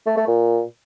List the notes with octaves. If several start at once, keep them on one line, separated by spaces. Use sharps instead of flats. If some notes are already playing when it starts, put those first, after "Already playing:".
A3
A3
A#2